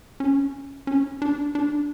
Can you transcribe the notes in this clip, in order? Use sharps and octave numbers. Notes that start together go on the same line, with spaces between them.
C#4
C#4
D4
D4